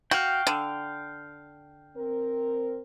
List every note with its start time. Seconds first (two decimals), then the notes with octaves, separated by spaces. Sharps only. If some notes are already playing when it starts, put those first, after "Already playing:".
0.11 F#4 F5 G5
0.47 D3
1.97 C4 A#4